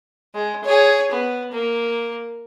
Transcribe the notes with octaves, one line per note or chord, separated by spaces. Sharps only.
G#3
G#4 C#5
B3
A#3